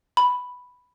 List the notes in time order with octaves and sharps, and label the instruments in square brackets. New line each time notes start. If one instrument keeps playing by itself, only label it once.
[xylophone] B5